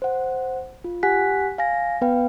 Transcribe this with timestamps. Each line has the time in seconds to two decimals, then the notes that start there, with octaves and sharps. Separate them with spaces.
0.02 C5 F#5
0.84 F4
1.03 G4 F#5 G#5 F#6 B6
1.58 F5 G#5 A#6
2.01 B3 B4 F5 G5